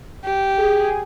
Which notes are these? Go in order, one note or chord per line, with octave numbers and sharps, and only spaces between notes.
G4
G#4